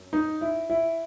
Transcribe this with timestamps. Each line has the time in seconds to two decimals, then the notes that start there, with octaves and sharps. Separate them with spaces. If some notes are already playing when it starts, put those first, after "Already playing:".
Already playing: F#2
0.13 D#4
0.41 E4
0.70 E4